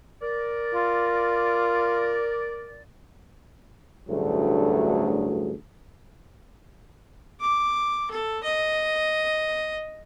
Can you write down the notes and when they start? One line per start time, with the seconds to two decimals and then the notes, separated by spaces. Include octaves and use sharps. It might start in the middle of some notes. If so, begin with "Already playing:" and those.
0.21 A#4 D5
0.74 F4
4.09 A1 D2 G2 F#3 A3 G#4
7.41 D6
8.11 A4
8.44 D#5